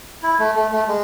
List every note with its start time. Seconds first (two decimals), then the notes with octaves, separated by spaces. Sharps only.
0.23 E4
0.39 A3
0.56 A3
0.72 A3
0.88 G#3